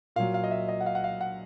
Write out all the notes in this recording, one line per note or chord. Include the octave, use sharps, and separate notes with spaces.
A#2 F#3 F5
F5
D#5
E5
D#5
F#5
F5
F#5
F5
F#5